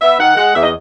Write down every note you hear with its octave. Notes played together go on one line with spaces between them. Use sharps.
B3 E5
D#3 F#5
G#3 F#5
E2 E5
D#5